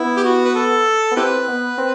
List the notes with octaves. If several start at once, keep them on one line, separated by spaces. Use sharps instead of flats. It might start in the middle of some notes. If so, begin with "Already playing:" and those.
Already playing: B3 E4
G4
F#4
B4
A4
B3
C4 E4 G4 B4
B3
C4